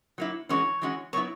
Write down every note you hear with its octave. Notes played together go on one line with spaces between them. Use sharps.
F#3 A#3 E4
E3 G#3 C#4 F#4 C#5
E3 G#3 C#4 F#4
F#3 B3 E4 C#5